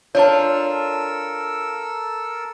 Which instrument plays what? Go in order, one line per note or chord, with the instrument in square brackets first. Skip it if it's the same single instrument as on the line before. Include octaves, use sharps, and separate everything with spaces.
[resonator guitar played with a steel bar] D4 F4 [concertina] A4 A#4 E6 [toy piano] C#5 A5